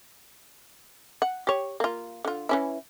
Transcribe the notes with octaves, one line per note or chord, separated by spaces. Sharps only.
F#5
G4 C#5
A#3 F4
D3 F4
E3 C#4 E4